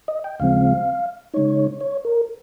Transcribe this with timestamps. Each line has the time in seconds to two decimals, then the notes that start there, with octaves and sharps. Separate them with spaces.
0.08 D#5
0.24 G5
0.39 D#2 C#3 F3 G#3 C4 F5
1.34 C#3 G#3 D#4 C#5
1.81 C#5
2.05 A#4